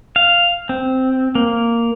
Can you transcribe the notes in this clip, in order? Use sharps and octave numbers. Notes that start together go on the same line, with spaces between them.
F5
C4
A#3